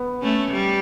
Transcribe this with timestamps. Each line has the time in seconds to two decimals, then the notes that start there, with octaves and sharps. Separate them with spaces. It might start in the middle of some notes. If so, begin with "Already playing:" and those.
Already playing: B3
0.22 A3 C#4
0.51 G3